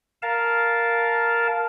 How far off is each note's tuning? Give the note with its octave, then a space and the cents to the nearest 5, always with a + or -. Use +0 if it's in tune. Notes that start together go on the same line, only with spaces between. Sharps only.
A#4 +0 F5 +0 A5 -10